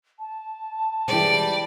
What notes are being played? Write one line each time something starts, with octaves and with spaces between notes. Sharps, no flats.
A5
E3 G3 G#3 D5